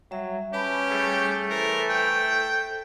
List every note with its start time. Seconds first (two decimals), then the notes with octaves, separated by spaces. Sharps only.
0.11 F#3 G3 E5
0.53 C#4 G4 B4 A5 B5
0.90 G3 A3 G#4 G5
1.50 E3 A4 A#4 C5
1.89 G5